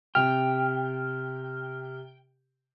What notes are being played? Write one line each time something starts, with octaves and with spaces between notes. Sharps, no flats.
C3 G4 G5 F6